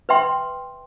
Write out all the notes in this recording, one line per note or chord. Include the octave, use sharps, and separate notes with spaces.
B4 E5 G5 C6